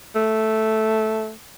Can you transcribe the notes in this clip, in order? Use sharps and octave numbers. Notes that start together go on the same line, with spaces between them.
A3